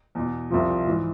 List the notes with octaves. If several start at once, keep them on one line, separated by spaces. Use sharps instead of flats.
E2 B2
C2 C3 F3
G#2 E3